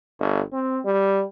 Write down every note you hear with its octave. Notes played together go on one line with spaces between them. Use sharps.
G1
C4
G3